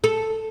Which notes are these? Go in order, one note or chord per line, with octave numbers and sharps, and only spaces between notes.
A4